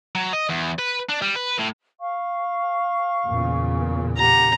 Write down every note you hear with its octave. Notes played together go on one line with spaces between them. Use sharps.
F#3
D#5
E2
B4
D4
G3
B4
A2
F5 C#6
E2 A#2 C#3
G4 F#5 A#5